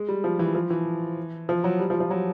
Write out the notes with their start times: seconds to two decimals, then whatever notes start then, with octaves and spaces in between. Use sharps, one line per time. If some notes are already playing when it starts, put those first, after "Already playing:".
Already playing: G#3
0.08 G3
0.24 F3
0.39 E3
0.55 F3
0.70 E3
1.49 F3
1.64 F#3
1.80 G3
1.90 F3
2.00 F3
2.10 F#3